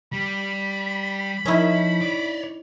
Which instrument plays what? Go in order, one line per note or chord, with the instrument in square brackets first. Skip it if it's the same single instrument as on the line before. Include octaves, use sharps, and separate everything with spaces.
[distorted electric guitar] G3 [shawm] B5
[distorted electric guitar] F3 [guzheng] C#4 D#4 E4
[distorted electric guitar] C#5 D5